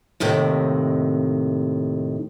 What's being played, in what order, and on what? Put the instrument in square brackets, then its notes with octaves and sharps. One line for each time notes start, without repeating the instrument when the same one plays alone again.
[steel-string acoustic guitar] D#2 A2 C3 D#3